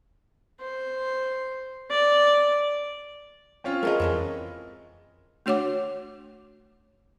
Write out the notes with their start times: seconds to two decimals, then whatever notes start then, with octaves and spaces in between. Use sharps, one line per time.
0.61 C5
1.91 D5
3.64 C4 C#4 F4
3.83 G#3 A3 G#4 A#4 D#5
4.00 F2 E3 G#3 A3
5.46 A3 D4 F#4 C#5 F#5 D6